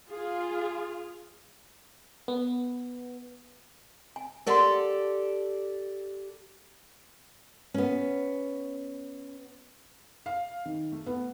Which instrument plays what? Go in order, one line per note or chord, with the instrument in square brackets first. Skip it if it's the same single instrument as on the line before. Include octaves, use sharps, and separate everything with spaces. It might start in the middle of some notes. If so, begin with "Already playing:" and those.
[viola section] F4 G#4
[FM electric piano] B3
[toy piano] G#5
[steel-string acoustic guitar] G4 A4 D5 [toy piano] A#4 F#5 C6
[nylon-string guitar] B3 C#4
[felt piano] F5
D#3
A3
B3